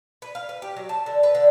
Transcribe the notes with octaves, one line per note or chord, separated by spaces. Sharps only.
B4
F5
B4
G4
F#3
A5
D3
B4
D3